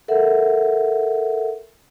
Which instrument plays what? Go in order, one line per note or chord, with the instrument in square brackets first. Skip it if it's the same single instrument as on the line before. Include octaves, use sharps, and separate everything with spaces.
[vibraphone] A4 A#4 E5 F#5